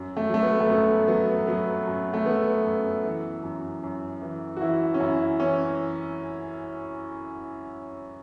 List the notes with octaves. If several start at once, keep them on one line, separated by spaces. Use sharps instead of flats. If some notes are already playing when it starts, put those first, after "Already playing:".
Already playing: F#2
A3
F#3 A3
B3
A3
F#2 B3
F#3 B3
F#3 B3
F#2
A3
F#3 B3
F#2
E3
F#2
F#2
E3
F#4
E3 E4
C#4
F#2 E4
E3 C#4